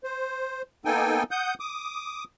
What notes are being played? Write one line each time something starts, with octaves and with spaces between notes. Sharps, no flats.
C5
A#3 B3 D#4 A4 G5 G#5
F#5 D#6 G6
D6 D#6